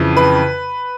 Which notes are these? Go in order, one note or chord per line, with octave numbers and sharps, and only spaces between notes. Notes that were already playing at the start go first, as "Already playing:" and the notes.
Already playing: F2 C#3 E3
B4